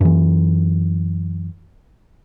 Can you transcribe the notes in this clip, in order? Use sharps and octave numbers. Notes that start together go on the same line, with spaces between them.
F#2 E3